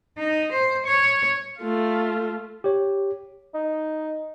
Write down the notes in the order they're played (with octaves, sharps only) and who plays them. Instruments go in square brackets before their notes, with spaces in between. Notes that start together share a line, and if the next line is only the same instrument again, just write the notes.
[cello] D#4
C5
C#5
[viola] A3 F4
[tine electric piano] G4 C#5
[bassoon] D#4